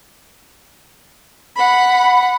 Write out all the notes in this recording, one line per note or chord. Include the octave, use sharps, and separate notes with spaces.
F#5 B5